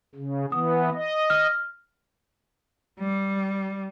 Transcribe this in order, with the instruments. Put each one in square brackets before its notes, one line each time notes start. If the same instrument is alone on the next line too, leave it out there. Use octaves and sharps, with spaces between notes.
[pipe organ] C#3
[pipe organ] E3 B3 [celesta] D#6
[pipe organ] D#5
[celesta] F6
[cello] G3